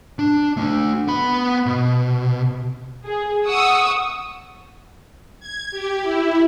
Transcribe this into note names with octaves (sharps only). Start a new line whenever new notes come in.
D4
A3 D4
B3 B5
B2
G#4
F#5 C#6 D#6 E6
G#6
G4
E4